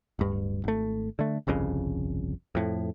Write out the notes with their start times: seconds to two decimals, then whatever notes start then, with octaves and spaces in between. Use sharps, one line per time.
0.19 D1 G2
0.64 G#1 A3
1.19 D3 A3
1.47 G1 C2 F2 C#3
2.55 F2 A2